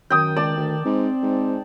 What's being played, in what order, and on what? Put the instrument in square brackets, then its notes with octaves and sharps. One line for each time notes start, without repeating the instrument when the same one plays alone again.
[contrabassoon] F#2 [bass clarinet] D#3 [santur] G5 D#6
[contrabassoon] C#2 [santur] D5 A5
[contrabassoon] D2
[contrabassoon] G#2 [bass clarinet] C4
[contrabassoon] G#2